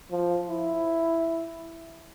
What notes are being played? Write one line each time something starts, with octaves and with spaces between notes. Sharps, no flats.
F3
E4